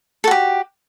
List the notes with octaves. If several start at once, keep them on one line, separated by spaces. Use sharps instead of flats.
F#4 G4 A4